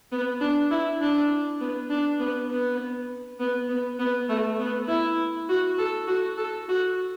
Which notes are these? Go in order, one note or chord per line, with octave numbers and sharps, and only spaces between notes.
B3
D4
E4
D4
B3
D4
B3
B3
B3
B3
B3
A3
B3
E4
F#4
A4
F#4
A4
F#4